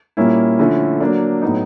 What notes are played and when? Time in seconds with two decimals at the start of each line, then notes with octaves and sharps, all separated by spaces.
0.17 A#2 G3 A#3 C#4 E4
0.59 D3 F3 A3 C#4 E4
1.00 F#3 A#3 D4
1.42 A2 F#3 B3 D#4